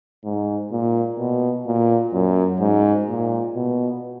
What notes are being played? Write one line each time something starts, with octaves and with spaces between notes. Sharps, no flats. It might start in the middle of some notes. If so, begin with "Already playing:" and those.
G#2
A#2
B2
A#2
F#2
G#2
A#2
B2